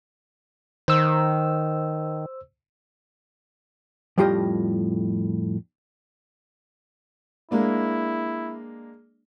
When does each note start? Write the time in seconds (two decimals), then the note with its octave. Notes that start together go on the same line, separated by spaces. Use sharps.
0.88 D#3 C5 E6
4.18 F2 A2 G3 F4 G4 D#5
7.51 G#3 A#3 D4 E4